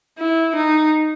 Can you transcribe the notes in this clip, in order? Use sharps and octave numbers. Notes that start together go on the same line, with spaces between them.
E4
D#4